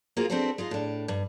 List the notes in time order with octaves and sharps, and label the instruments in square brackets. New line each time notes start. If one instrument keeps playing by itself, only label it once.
[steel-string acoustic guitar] A#3 F4 F#4 G#4 C5
C4 D4 F#4 A4 B4 C5
G#3 D#4 F4
A2 D4
G2